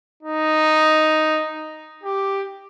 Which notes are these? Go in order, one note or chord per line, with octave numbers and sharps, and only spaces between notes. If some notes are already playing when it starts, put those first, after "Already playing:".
D#4
G4